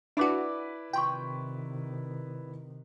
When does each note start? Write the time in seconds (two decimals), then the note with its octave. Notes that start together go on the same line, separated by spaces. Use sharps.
0.17 D4 E4 F#4 B4 D5 A5 B5 D6
0.93 C3 D#3 F4 G5 C6 C#6